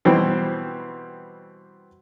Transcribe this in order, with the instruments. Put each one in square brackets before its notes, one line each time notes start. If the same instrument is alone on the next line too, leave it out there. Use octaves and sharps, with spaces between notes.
[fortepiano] B2 E3 G3 C4